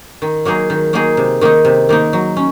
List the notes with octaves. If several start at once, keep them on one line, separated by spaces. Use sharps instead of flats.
D#3
F#3 A#3 D#4 G#4
D#3
F#3 A#3 D#4 G#4
C3
D#3 A#3 D#4
C3
D#3 A#3 D#4
F#3
C#4